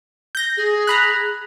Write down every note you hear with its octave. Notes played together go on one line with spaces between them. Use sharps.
G6 A#6
G#4
A#5 B5 F#6